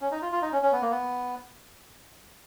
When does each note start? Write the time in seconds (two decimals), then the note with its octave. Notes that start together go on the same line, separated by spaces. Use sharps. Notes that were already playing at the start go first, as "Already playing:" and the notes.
0.01 C#4
0.11 D#4
0.22 F4
0.32 F4
0.42 D#4
0.52 C#4
0.62 C#4
0.72 B3
0.82 A#3
0.91 B3